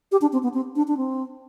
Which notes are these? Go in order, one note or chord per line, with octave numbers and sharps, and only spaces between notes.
G4
D4
C4
B3
C4
D4
D4
C4